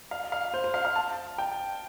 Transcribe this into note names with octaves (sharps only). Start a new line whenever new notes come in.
F5
F5
C5
C5
F5
F5
A5
G5